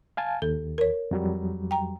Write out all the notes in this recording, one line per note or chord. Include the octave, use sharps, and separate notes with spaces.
F5 G#5 A5
D#2 A4
A#4 C#5
F2 F#3 G3
G5 A#5